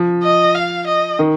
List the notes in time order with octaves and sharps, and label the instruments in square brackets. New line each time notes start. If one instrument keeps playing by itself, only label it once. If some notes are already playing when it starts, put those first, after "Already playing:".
Already playing: [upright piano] F3
[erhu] D#5
F5
D#5
[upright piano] D#3